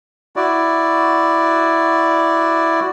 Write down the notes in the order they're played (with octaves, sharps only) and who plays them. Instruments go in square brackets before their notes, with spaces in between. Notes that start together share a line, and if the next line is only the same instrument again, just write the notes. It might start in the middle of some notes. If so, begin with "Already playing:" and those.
[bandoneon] E4 F#4 D5